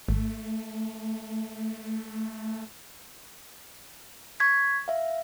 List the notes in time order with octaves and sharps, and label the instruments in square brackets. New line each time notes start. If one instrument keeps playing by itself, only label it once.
[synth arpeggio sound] G#1 [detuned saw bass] A3
[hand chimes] C#6 G#6 B6
E5 F5